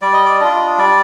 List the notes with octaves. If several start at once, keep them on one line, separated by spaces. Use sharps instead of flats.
G3 D5
D#5
D5
D4 F4 D#5
G3 D5